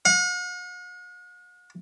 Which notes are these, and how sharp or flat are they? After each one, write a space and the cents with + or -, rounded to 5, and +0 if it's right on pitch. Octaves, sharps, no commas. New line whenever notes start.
F#5 -45